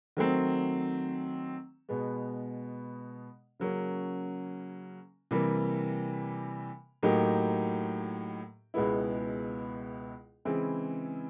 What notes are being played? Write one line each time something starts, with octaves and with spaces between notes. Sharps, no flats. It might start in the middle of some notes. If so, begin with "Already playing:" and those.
D#3 F#3 A3 C4
B2 G#3 B3
C#3 F#3 A#3 C#4
C3 E3 G3 A#3
A2 F#3 A#3 D#4 G4
C#2 B2 G#3 B3 E4
C#3 E3 G#3 C4 E4